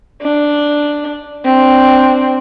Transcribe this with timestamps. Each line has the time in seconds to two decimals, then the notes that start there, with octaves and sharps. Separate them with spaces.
0.22 D4
1.45 C4 D4